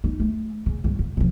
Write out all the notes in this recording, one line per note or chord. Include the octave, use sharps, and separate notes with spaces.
D#4
A3
C#3
G2 D3
D3
C3 F3